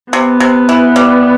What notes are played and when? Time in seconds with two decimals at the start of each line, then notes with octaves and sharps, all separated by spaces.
0.13 C3 B3
0.40 C3
0.69 E3
0.96 G3